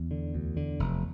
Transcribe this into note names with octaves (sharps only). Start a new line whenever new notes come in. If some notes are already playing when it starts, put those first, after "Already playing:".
Already playing: E2
D3
D2
D3
F1